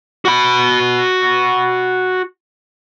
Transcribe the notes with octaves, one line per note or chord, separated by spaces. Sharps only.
F#4 B5